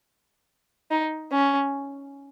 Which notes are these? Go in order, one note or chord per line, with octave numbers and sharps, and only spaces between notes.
D#4
C#4